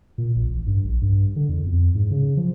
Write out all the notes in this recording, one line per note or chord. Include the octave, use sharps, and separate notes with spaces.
A#2
A#1
A1
G2
A#1
G2
D3
E2
F2
G#2
C#3
F3